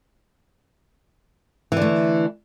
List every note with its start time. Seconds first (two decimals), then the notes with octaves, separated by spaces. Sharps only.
1.72 E3
1.77 D3
1.82 A3